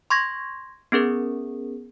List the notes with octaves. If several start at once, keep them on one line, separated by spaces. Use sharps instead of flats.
C6 C#6 G#6 A#6
B3 C#4 G#4 A#4